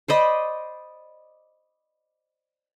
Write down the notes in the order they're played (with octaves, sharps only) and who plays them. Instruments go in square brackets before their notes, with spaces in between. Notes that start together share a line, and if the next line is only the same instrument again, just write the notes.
[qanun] C5 D5 D#5 B5